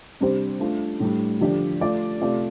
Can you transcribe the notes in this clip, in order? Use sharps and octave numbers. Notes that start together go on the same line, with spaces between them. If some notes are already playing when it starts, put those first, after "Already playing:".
C3 G3 D4 G4 C5
A3 D4 F4
A2 G3 D4
D3 F3 D4 G4 D5
A3 F4 D5
C3 A3 F4 D5